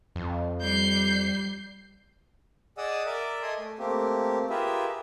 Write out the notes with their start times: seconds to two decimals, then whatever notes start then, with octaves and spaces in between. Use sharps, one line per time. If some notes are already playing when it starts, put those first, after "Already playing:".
0.15 F2
0.61 G3 G6 C7
2.78 G#4 D5 D#5 F#5 D#6 E6
3.06 A#4 D5 E5 D6
3.42 A4 D#5 G#5 C6 D#6
3.59 A3
3.79 A3 A#3 C4 G4
4.50 F4 G4 G#4 A#4 B4 E5